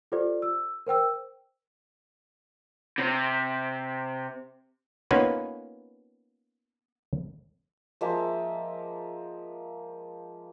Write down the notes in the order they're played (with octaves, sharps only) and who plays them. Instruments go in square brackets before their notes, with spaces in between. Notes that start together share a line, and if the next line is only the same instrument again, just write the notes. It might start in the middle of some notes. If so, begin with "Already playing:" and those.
[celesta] F4 G4 A4 C5 D5
E6
A#4 C5 G5 E6
[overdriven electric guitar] C3
[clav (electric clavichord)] A#3 B3 C#4 D#4 F4 B4
[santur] F3 G#3 A#3 E5